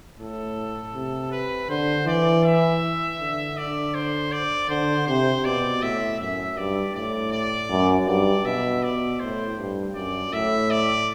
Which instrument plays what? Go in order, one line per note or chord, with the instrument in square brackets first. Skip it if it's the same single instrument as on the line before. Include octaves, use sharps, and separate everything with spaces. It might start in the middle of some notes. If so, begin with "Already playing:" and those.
[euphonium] A2 [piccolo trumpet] A4
[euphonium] C3
[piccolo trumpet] B4
[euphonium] D3 [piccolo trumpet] C5
[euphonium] E3 [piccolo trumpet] D5
[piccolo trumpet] E5
[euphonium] D3
[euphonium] D3 [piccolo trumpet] D5
[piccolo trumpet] C5
D5
[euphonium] D3 [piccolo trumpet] C5
[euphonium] C3 [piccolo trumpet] C5
[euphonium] B2 [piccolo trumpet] D5
[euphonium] A2 [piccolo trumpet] E5
[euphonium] F#2 [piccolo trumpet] E5
[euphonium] G2 [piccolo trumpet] D5
[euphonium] A2 [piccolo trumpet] D5
[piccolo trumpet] D5
[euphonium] F#2
[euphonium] G2 [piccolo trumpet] D5
[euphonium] B2 [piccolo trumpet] E5
[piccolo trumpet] D5
[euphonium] A2 [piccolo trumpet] C5
[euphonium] G2
[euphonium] F#2 [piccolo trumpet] D5
[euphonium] A2 [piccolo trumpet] E5
[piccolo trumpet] D5